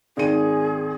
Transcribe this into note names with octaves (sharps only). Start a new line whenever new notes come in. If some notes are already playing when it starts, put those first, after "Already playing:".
G#1 D#3 G#4 D#7